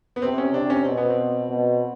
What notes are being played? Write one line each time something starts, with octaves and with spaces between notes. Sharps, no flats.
B3
C3 C4
C#4
C3 D4
C#4
B2 C4
B3
C4
B2